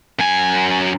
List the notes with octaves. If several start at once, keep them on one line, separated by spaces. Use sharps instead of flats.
F#2 G#5